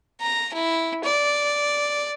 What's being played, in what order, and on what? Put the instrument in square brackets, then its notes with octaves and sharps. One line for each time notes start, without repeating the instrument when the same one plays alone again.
[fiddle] A#5
E4
D5